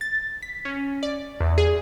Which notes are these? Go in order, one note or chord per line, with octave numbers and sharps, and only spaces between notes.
A6
B6
C#4
D5
E2
G#4